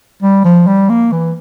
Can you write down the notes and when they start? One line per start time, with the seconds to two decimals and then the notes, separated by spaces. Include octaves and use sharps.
0.22 G3
0.44 F3
0.67 G3
0.89 A#3
1.12 E3